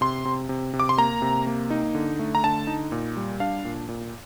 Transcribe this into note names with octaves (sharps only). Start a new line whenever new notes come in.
C3 C6
C3
C3
C3
D6
C6
A#3 A#5
C3
A#3
D#4
D3
A3
A#5
D3 A5
D#4
A#2
G3
D4 F5
A#2
A#2